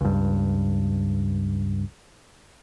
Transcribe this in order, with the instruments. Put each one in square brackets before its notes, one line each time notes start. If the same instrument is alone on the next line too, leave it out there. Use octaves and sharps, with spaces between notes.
[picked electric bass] C#2 G2